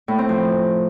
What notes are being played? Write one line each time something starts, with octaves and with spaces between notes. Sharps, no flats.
A2
C4
F3